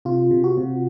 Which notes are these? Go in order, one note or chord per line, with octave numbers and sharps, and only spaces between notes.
C3 F4
C3
F#4
C3